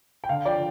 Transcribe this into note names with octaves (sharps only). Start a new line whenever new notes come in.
G5
D3 F5
F3 D5 G5